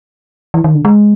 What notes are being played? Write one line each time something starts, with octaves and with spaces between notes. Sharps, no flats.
E3
D#3
D3
G#3